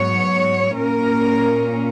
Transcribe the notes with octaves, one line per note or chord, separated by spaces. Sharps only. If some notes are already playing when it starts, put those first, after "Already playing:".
Already playing: G#2 F#3 B3 C#5
A#2 A#3 C#4 A#4